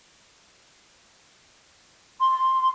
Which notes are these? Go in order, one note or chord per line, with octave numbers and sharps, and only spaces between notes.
C6